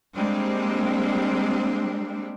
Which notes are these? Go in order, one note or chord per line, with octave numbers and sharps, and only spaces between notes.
G3 G#3 A#3 C4 D4